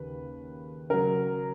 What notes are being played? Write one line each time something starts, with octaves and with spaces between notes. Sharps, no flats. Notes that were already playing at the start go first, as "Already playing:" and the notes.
Already playing: D#2 C#3 B4
C#3 F#3 A#4